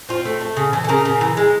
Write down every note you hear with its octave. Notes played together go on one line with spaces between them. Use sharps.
C4 F4
A3
A3
C#3
E3
A4
C#3 A#4
C#3
E3
G#3